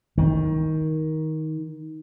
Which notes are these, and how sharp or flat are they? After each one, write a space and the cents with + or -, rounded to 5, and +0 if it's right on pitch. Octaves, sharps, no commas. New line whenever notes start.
D#3 +15